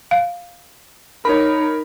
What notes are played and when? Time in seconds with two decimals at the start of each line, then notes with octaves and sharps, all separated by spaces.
0.11 F5
1.25 D#4 A#4 C#5 B5